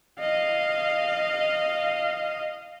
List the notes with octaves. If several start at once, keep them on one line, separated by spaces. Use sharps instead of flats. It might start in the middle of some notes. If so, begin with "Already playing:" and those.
D#5 F5